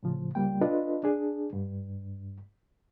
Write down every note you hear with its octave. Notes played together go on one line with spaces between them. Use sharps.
A2 C#3 F3
C#2 G3 A#3 G5
D4 F4 A4 B4 D#5
D4 G#4
G2